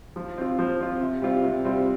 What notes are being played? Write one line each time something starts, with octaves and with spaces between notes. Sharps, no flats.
F3
C4 F4
F3
C4 F4
C3
G3 C4 F4
C3
G3 C4 F4